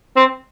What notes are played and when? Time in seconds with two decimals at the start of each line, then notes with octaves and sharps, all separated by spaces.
0.17 C4